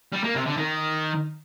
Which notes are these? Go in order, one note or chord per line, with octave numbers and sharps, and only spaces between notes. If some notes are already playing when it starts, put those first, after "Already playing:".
G3
A#3
C3
D3
D#3